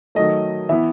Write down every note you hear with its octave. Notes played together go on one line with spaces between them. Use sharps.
D#3 F#3 A3 D#5
E3 B3 E4 E5